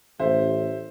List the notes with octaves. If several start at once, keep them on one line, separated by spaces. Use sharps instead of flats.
A1 C5 E5